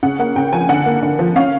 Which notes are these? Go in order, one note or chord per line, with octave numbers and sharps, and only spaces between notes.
C#3 F#5
A#3 F#5
C#3 G5
F3 G#5
D3 F#5
A#3
D3
F3
C#4 F5